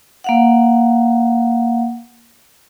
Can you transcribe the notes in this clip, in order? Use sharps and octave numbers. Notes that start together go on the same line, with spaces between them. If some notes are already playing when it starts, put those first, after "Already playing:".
A#3 F5 F#5